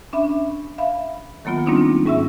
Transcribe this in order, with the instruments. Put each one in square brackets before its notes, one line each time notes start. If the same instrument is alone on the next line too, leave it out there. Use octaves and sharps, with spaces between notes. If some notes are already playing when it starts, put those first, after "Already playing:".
[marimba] C#4 D4 E5 B5
E5 F5 B5
D#3 F#3 A#3 B3 F4
G3 A#3 C4 D4 D#4 F4
G#2 G3 C#4 E5 E6